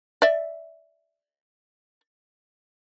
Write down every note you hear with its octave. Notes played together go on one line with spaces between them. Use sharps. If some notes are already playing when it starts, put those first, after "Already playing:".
D5 E5